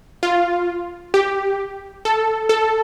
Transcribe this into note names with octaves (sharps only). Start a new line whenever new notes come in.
F4
G4
A4
A4